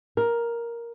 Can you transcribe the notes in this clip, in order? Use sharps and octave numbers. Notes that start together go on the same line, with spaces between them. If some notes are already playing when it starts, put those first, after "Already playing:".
A#4